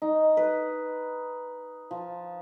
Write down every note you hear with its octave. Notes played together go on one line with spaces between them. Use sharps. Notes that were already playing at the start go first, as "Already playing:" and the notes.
D#4
B4
F3